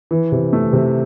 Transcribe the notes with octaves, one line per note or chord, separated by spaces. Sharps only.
E3
C3
A3
C3